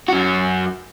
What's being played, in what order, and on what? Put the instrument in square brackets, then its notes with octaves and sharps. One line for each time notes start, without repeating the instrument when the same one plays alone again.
[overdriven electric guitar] F#2 F#4